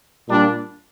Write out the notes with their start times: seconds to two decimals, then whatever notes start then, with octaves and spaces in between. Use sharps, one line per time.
0.29 A#2 G3 D4